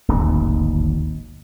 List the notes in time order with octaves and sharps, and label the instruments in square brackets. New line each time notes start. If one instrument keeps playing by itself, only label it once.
[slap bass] D1 G#1 D#2